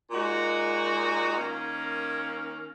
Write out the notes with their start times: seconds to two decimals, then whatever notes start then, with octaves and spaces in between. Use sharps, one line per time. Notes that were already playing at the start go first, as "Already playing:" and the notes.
0.11 A#2 G#3 D#4 F#4
1.37 D#3 A#3 C#4